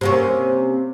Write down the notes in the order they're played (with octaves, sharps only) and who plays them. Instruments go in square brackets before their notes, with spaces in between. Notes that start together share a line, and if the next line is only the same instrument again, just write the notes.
[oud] C3 A#3 C#4